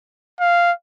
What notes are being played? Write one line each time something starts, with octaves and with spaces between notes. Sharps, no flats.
F5